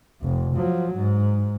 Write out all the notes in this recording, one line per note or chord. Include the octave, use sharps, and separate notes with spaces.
F1 F2
F3 F#3
G#2